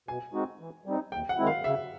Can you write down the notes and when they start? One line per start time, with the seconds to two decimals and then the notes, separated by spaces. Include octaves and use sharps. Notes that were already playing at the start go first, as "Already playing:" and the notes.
0.08 B2 G#5
0.33 G#3 C4 D#4 F#4
0.60 E3
0.86 G3 C4 D#4
1.12 D#2 G5
1.29 F#5
1.38 D#3 G#3 C4 E4
1.47 F5
1.64 C#3 E5